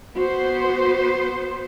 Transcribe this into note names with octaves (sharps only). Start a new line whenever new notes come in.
B3 F#4 C5